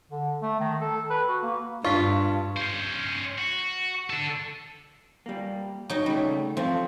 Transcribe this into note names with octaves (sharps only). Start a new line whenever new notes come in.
D3
A3
D#3
A4
B4
F#4
A#3
G2 D4 F4 C#6 B6
C#4 C5
F#4
D4 A4
G3 A#3
F#3 D#4
C#3 G3 A3
F3 A3 C4